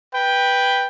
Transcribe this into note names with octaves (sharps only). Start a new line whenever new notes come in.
B4 G5